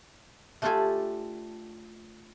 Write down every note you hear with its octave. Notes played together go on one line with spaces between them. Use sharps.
A3 D4 F4 G4 A4 G#5